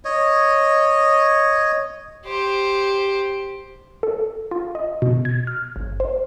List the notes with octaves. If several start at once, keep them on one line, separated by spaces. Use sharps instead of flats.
C#5 D#5
G4 C5
A4
F4
D#5
B2
G#6
F6
G1
C5